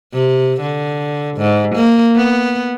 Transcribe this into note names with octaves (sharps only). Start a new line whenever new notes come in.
C3
D3
G#2
A#3
B3